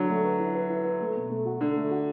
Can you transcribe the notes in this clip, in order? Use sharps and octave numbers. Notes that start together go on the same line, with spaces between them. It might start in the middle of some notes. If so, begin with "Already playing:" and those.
Already playing: D3 F#3
A3
B4
E4
B4
E4
B4
A3
B2
A3
F#4
D3 A3
A3
F#4